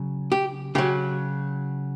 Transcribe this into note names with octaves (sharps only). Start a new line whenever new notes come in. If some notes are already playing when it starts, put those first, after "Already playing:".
Already playing: C#3 F#3
G4
C#3 F#3 G4